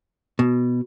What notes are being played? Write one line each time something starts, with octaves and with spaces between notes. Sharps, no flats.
B2